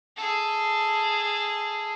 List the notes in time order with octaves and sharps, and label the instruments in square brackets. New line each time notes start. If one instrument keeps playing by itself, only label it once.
[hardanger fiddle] G#4 A4